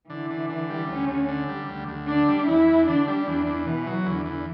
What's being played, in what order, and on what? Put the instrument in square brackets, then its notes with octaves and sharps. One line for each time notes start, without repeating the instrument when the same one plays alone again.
[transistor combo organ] D3 [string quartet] E3
[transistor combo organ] D3
D3
G3
[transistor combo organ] D2 [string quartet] C#4
[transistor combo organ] D2
D3
G3
D2
D2
[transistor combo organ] D3 [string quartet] D4
[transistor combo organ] G3
[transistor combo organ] E2 [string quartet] E4
[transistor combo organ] E2
[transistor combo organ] D3 [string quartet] D4
[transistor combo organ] G3
[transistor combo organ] E2 [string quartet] D4
[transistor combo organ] E2
[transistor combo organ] B2 [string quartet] E3
[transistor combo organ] F#3
[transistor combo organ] E2 [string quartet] D3
[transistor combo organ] E2